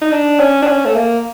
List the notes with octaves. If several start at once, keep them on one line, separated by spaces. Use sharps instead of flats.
D#4
D4
C#4
D4
C#4
A3
A#3